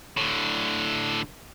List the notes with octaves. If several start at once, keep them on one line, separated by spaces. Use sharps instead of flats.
A2 D3